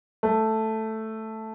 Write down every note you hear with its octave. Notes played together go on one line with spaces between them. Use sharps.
A3